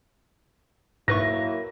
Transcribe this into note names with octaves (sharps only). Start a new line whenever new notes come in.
G#2 F#3 A#3 E4 B4 C#6 A#6